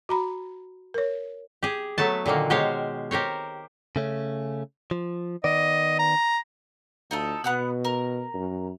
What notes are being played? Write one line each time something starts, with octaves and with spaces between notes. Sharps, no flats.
F#4 A#5 B5
A#4 C#5
G4 G#4
F#3 A3 B3 A5
A#2 D3 D#3 A#3
B2 G#3 G4 C5 C#5 F5
G4 A#4 C5 C#5
C#3 A3 C#4
F3
D#3 B3 D5 D#5
A#5
D2 D#4 F4 A4
B2 B3 F#5 F#6
A#4
F#2